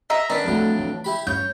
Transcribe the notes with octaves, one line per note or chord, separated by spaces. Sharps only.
D#5 E5 A#5
D#3 B3 C#4 D4
F2 A2 F#3 G3 A3
E3
E4 G4 B5
G2 C#4 C#5 G6